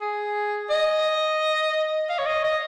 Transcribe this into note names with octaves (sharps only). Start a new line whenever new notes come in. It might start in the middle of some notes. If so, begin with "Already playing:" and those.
G#4
D#5
F5
C#5
D#5
D#5